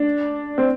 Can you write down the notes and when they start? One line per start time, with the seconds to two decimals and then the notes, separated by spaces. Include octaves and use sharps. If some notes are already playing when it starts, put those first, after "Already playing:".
Already playing: D4
0.58 C4